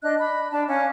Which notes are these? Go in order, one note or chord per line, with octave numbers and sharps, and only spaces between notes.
D4 D#5 F#6
B5
D4 A5
C#4 F5